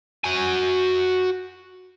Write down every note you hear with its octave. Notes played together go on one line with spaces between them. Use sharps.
F#4 G#5